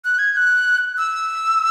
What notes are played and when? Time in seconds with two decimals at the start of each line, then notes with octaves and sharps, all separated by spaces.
0.05 F#6
0.19 G#6
0.33 G#6
0.37 F#6
0.98 E6